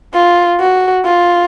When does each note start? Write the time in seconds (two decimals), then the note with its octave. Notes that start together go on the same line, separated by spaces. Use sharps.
0.14 F4
0.60 F#4
1.05 F4